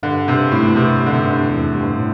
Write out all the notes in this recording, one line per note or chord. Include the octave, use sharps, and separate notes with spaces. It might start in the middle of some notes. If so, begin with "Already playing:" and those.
G2 D3
C3
A2
E2
G2 C3
D3
G2 C3
G2
E2
G2
A2